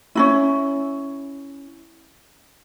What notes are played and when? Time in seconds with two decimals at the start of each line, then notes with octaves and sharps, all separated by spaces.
0.15 C#4 D#4 E4